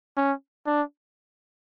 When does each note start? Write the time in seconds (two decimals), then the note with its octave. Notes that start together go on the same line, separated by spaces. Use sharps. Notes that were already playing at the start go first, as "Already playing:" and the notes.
0.17 C#4
0.66 D4